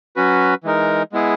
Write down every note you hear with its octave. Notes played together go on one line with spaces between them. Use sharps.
F#3 C#4 F#4 B4
E3 G#3 D#4 A#4
G#3 B3 E4 G#4